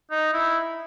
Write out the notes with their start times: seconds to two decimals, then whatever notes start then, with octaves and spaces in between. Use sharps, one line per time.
0.11 D#4
0.33 E4